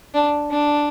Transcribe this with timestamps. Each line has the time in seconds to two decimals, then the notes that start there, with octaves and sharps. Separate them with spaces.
0.14 D4
0.51 D4